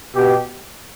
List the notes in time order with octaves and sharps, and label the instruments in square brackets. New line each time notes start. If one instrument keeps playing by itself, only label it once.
[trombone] B2 [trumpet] G4